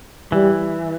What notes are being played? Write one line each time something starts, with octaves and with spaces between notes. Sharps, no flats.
E3 G3